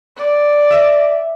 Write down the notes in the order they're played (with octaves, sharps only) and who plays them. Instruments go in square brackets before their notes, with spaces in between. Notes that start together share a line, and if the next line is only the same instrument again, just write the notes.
[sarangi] D5
[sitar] E5